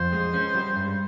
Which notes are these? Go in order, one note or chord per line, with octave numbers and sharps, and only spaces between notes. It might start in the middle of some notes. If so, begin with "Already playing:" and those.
Already playing: F2 C5
G#3
C#4
G3
G2